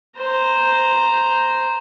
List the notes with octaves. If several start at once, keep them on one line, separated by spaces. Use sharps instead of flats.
C5 A#5